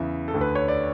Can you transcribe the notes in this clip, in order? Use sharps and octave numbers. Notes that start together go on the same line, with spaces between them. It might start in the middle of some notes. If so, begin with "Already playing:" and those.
Already playing: E2 C#3 E3 E5
A4
D2 D3
B4
C#5
D5